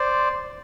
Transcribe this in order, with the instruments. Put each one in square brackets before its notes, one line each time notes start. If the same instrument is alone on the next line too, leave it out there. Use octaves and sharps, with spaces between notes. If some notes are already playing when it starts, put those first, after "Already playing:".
Already playing: [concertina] C5 D5